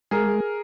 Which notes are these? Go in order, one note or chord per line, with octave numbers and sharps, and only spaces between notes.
G#3 G#4 A#4